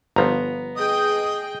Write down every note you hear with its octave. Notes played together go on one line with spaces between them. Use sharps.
G1 F3 B3 A#5
G#4 D#5 G5 D#6